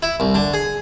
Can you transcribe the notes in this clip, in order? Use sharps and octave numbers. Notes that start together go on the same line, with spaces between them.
E4
C2
D3
G#4